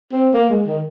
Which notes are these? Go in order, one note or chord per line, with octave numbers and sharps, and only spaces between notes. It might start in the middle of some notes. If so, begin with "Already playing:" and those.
C4
A#3
G#3
D#3